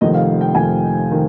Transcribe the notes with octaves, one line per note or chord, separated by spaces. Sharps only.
F1 F2 D#3 D#5
F5
G5
F1 F2 D#3 G#5
D#3